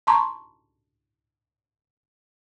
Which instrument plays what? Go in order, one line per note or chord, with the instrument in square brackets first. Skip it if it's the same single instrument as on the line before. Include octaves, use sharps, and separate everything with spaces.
[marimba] A5 A#5 C6 C#6